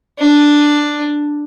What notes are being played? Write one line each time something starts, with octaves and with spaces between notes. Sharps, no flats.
D4